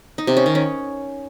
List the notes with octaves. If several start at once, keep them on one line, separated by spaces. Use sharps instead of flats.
D#4
C3
C#4
D#3
C#4